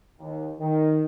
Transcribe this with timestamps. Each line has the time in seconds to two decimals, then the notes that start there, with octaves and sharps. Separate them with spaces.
0.20 D#2
0.59 D#3